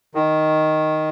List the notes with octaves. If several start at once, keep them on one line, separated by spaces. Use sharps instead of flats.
D#3